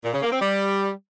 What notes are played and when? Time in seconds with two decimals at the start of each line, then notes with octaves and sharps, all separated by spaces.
0.04 A#2
0.13 C#3
0.22 A#3
0.31 C4
0.40 G3